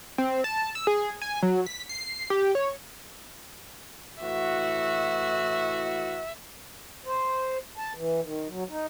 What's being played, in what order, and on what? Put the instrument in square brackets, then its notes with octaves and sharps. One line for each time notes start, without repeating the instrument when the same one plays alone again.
[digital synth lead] C4
A5
E6
G#4
G#5
F#3
B6
C7
G4
C#5
[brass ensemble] A2 E3 F#4 [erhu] E5
[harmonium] C5
A5
E3
D#3
F#3
D#4